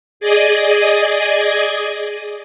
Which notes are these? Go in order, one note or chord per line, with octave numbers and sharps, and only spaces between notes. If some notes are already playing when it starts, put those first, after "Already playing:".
G#4 D5 D#5 G#5